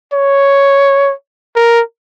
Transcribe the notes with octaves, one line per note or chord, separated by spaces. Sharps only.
C#5
A#4